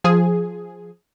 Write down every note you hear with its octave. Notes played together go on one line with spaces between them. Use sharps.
F3 G#4